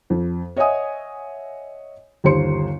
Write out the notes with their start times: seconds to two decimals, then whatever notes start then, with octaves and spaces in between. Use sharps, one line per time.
0.10 F2
0.57 C#5 D#5 E5 F#5 G#5 D#6
2.24 G1 D#2 G4 C5 C6 C#7